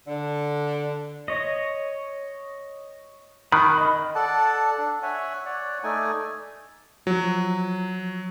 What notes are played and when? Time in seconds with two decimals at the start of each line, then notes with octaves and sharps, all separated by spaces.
0.07 D3
1.28 C#5 D#5
3.52 D#3 B5 F#6
3.74 D#5 B5
4.15 A4 D5 F#5 A5
4.78 D4
5.03 C#5 E5 F#5 G#5
5.46 C#5 D5 F#5
5.83 A3 D#4 D5 G#5
7.07 F3 F#3